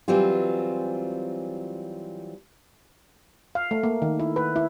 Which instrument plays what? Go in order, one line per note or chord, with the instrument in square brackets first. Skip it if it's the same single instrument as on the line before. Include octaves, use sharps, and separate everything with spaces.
[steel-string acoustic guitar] E3 F#3 G3 C4 F4
[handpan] F5
A3
A#3
D#3
E4
B4
E4